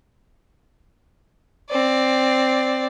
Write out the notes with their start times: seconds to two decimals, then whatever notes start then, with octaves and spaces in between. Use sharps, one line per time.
1.70 C4 D5